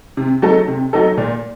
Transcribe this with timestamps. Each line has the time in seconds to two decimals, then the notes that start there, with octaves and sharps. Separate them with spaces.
0.17 C3
0.42 F#3 A3 D#4 A4
0.68 C3
0.93 F#3 A3 D#4 A4
1.18 A#2